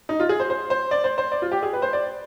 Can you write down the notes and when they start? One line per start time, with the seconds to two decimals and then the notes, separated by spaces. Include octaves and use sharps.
0.09 D#4
0.20 F4
0.29 G#4
0.40 C5
0.50 C5
0.70 C5
0.91 D5
1.04 C5
1.18 C5
1.32 D5
1.42 F4
1.52 G4
1.63 G#4
1.73 B4
1.82 C5
1.93 D5